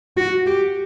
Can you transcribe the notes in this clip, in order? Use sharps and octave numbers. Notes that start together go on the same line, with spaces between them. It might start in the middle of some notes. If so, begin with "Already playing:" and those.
F#4
G4